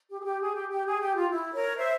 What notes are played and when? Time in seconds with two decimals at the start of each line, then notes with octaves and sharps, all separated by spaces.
0.09 G4
0.20 G#4
0.24 G4
0.40 G#4
0.55 G4
0.70 G4
0.86 G#4
1.01 G4
1.15 F4
1.30 E4
1.53 A#4 C#5
1.77 C5 E5